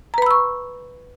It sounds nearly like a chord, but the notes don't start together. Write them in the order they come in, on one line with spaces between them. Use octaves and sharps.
A#5 B4 B5 E6 C#6